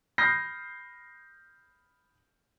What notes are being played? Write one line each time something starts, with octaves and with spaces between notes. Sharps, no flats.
B5 D#6 F6 G6 A#6 C7